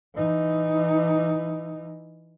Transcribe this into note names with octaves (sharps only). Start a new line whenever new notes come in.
E3 D#4